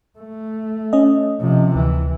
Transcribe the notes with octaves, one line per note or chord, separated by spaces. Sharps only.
A3
C#4 D#5
C3 F3
D2 E3